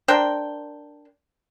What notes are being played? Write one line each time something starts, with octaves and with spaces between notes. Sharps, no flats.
D4 A#4 C5 G5